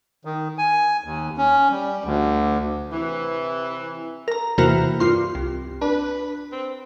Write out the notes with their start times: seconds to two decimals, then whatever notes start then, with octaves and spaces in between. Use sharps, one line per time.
0.25 D#3
0.58 G#5
1.04 D#2
1.38 C#4
1.71 G3
2.04 D2
2.92 C3 E3
4.28 A#4 A#5
4.58 E2 C3 E3 A#3 F#4 A#4
5.00 G2 F4 C6
5.35 C2
5.82 D4 B4
6.52 C4